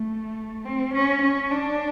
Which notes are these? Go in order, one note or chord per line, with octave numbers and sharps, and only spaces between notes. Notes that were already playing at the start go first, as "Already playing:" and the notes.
Already playing: A3
C4
C#4
C#4
D4